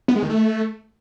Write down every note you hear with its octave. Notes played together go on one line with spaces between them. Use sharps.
B3
G#3
D#3
A3